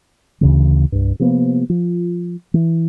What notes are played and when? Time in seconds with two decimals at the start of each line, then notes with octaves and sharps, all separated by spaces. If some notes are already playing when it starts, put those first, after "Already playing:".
0.41 D2 C#3 E3
0.92 C2 G2
1.19 C3 F3 A#3 B3
1.69 F3
2.54 E3